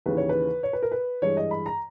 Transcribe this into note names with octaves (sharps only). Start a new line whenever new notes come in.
D#2 C#3 E3 B4
C#5
B4
C#5
B4
A#4
B4
G2 E3 G#3 C#5
D#5
B5
A#5